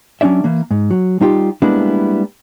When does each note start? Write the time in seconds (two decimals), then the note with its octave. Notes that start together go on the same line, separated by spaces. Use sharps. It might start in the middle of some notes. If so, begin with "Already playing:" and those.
0.21 F#3 C#4 D4 D5 E5
0.44 E3 A#3
0.71 G#2
0.91 F#3
1.21 G3 D#4 F4 G4
1.62 G3 G#3 A#3 B3 D4 E4